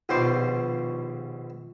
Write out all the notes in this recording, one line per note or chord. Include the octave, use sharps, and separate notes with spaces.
A#1 D#2 B2 C5 C6 D6